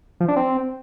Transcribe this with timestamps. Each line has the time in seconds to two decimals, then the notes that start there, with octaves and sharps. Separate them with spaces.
0.20 F3
0.28 D4
0.36 C4